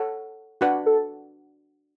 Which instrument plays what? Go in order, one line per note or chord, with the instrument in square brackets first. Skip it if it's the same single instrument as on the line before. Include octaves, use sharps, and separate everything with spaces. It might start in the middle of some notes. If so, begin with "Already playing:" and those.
Already playing: [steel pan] A4 C#5 F#5
D4 F#4 B4 D5 F#5
[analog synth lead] A4